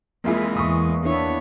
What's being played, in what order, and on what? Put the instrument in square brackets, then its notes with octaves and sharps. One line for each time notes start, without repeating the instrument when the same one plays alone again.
[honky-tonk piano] F2 F4 G#4 [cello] E3 G#3 [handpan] A#3 E5
[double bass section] E2 [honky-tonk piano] C#6 D#6
[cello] B3 C#5 [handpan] D4 E4 E5